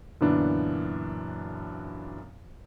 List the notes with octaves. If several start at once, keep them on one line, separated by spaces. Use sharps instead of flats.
F#2 A#2 D3 E3 B3 D4